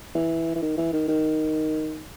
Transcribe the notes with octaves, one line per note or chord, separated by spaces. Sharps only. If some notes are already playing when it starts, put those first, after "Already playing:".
E3
E3
D#3
E3
D#3
D#3